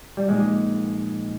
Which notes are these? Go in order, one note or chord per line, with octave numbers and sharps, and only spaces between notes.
G3
A#2 F3 G#3 A#3 D#4